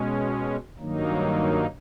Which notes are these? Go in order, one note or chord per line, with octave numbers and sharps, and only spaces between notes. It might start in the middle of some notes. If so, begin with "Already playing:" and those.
Already playing: B2 G#3 C#4
G2 D#3 F#3 A#3 D#4